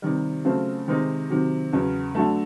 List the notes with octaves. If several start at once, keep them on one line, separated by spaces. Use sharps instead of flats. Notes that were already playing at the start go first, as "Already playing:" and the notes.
C3 D#3 G3
C#3 F#3 A3 C4 F4
C3 D#3 G#3 C4 D#4
C3 D#3 F#3
E2 C#3 F#3
D3 F#3 A3